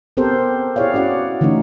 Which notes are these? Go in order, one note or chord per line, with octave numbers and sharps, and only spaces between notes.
B3 C4 G4 A4 A#4 C5
E4 G4 G#4 C#5 D5 F5
C#4 F#4 D5 F#5
D3 E3 A3 C#4 D#4